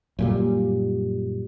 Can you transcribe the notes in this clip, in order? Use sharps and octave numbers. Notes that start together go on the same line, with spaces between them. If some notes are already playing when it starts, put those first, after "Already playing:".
F#2 A#2 G3